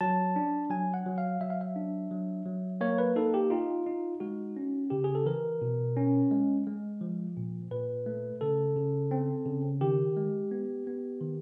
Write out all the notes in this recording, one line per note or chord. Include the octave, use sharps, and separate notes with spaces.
F#3 A5
D4
F#3 G#5
F#5
F#3
F5
F#3 E5
F5
E5
D4
F#3
F#3
A#3 C#5
B4
D#4 A4
G4
D#4 F4
D#4
G#3 F#4
C#4
C#3 G4
G#4
A4
E3 A#4
B2
C#4
G#3
G#3
F3
A#2
A#2 B4
A3
C#3 A4
C#3
C4
C#3
D#3 G4
G#3
B3
B3
D#3